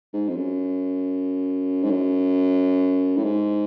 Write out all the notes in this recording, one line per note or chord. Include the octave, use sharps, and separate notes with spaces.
G#2
F2
F#2
G#2
F#2
A2
G#2